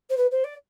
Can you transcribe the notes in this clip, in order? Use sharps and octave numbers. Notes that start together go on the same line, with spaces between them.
C5
B4
C5
D5